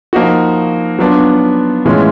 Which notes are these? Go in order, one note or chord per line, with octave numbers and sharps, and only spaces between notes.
F3 A#3 D#4 F#4
F#3 B3 D4 F4
A2 E3 G#3 C#4 F4